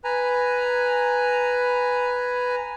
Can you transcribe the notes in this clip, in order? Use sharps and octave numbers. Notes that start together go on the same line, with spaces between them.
B4 G#5 A#5